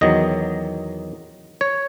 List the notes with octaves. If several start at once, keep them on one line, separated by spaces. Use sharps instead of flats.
E2 D#3 F#3 D#5
C#5